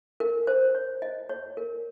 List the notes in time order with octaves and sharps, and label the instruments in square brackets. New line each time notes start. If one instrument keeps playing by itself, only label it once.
[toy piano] A#4
C5
C#5
D#5
C#5
A#4